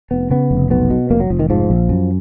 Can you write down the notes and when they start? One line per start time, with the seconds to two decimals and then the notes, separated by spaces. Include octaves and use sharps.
0.11 F1 B3
0.30 C#3 B3
0.51 F1
0.70 B1 B3
0.90 B2
1.10 F1 A#3
1.20 F#3
1.30 F1 F3
1.39 D#3
1.50 G#2 F3
1.70 A#1
1.89 F#2